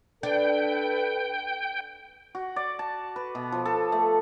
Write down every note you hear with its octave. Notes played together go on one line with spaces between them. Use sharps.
D4 A4 B4 G5
F#4
D5
A5
B4
B2
F3
A4
A3